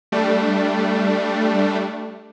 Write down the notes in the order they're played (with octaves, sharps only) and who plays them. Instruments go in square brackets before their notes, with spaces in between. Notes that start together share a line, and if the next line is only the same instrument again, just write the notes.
[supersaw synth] G3 A3 D4